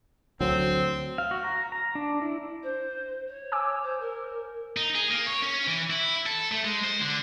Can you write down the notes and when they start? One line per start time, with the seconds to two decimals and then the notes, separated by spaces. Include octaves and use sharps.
0.41 D2 F#3 C4
1.18 F5
1.31 F#4
1.44 A#5
1.72 A#5
1.95 D4
2.22 E4
2.62 C5
3.27 C#5
3.52 G#5 D6 E6
3.82 C5
4.00 A#4
4.77 D#4
4.95 G#4
5.10 A#3
5.26 C#5
5.42 C#4
5.67 E3
5.90 E4
6.26 A4
6.52 A3
6.64 G#3
6.84 C5
7.01 D3